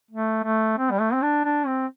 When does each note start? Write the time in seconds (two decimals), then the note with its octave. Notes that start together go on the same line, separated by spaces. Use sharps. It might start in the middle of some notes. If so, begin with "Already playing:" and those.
0.11 A3
0.44 A3
0.78 C4
0.91 G3
0.99 A3
1.13 C4
1.22 D4
1.45 D4
1.66 C4